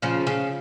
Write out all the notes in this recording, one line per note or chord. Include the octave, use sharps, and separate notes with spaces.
C#3 F3
C#3